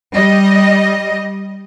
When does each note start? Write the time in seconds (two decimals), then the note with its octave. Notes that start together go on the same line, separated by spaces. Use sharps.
0.13 G3 D#5